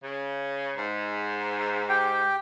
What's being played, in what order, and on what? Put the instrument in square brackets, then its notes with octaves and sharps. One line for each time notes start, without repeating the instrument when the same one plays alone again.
[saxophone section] C#3
G#2
[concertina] G4 G5